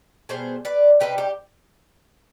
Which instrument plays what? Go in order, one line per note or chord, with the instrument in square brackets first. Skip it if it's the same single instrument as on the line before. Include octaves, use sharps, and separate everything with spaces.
[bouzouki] B2 G3 B3 G#4 C5
B4 D5
C3 G3 C4 D#4 G4 B4
G4